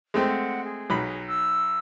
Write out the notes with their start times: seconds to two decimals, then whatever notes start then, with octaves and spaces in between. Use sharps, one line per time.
0.14 G#3 A3 C4
0.28 F#5
0.65 G#4
0.90 B1 F#3 B5
1.27 E6